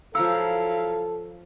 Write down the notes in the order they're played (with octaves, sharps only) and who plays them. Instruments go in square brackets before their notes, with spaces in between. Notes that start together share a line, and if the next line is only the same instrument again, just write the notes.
[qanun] F3 A#4 C#5 [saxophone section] F#3 E4 F5 [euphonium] A4 [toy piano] E6